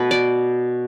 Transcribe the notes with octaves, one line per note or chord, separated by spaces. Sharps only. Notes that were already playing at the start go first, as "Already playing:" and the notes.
Already playing: B2 A3 B4
D5